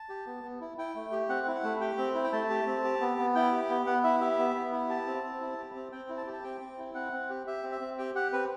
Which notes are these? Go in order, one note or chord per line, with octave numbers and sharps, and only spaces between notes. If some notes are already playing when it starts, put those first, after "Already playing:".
Already playing: A5
G4
B3
B3
E4
E4 G5
A3
G4
C4 F#5
E4
F#5
A3
G4 G5
C4
E4
G5
A3 A5
G4
C4
G4
B3
B3
E4 G5
G4
B3
B3 F#5
E4 E5
G4 E5
B3
B3
E4
G4 A5
C4
C4
E4
G4
C4
C4 G5
E4
A5
G4
A5
C4 G5
C4
E4
C4 F#5
C4
G4
G4 E5
C4
E5
C4
G4 G5
G4 F#5
C4 B4